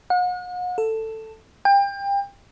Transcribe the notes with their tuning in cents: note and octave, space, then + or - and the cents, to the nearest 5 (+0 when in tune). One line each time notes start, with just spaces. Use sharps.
F#5 -40
A4 +10
G5 +30